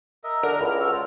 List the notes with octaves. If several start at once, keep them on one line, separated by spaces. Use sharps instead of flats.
A#4 D#5 E5
D3 D4 A#4
C#2 E4 F6
F#4 A4
F4 C5